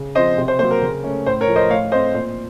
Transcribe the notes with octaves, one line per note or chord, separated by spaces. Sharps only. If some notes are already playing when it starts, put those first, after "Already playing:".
Already playing: C#3
F3 C4 C5 D#5
C3
C5
F#3 A#3 C5
A#4
C#3
A3 C#4
A2 C5
A#4 C#5
F3 A3
C5 D#5
A2 C#5 F5
A3 C4 C5 D#5
A#2 C5